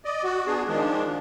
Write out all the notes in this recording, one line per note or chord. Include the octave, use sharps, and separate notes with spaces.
D5 D#5
F#4
B3 D4 G#4
D#3 F3 G#3 D4